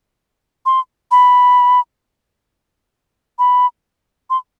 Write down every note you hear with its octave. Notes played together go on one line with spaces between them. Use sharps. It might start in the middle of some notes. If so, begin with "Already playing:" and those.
C6
B5
B5
C6